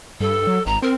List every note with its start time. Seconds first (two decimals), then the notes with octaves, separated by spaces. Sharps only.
0.20 G2 A4
0.47 F#3
0.66 G#1 A#5
0.82 C4 A#4